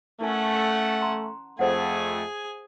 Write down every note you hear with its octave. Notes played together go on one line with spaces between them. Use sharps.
A3 C#4 E4 A#4 F#5 G#5
A5 A#5 C6
F2 A3 G#4 C5 F#5 G#5